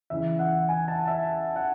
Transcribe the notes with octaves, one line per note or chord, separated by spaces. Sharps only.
E2 C#3 E3 E5
F#5
G#5
A5
E5
F#5